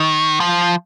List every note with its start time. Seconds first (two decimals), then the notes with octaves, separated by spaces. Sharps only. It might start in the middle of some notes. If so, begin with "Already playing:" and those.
Already playing: D#3
0.40 F3